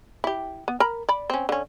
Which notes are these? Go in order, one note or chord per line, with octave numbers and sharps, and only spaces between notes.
E4 G4
B3
A#4 A#5 B5
D5 B5
C4 C#4
D3 C#4